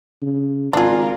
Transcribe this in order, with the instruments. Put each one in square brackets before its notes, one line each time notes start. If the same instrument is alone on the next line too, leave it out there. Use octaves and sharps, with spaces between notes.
[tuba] C#3
[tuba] G#1 [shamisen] D4 G#4 [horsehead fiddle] F4 A#4